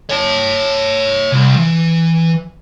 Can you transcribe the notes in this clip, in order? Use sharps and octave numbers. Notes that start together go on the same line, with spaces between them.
C#5 A5
C2
E3